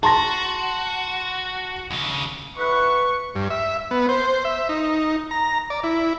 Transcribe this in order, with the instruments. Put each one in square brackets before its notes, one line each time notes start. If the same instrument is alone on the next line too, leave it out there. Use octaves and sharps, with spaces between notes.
[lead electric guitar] F#4 [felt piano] A5 C6 A#6
[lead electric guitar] D#2 C#3
[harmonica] E4 F#5 B5 [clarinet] B4 [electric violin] C#6
[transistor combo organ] G2
E5
B3
C5
E5
D#4
A#5
D5
E4